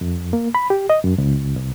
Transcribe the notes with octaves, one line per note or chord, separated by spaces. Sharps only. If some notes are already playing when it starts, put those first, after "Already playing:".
F2
A#3
B5
G4
D#5
F#2
C#2
C2